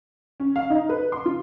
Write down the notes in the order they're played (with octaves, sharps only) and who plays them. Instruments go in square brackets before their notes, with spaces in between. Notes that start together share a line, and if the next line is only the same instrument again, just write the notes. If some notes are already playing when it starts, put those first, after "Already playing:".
[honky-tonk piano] C#4
F5
D#4
B4
C6
F4